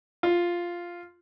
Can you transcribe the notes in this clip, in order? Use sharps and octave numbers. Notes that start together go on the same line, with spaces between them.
F4